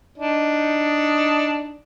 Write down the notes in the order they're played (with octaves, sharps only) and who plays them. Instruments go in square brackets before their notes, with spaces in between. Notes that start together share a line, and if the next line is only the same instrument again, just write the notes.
[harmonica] D4 D#4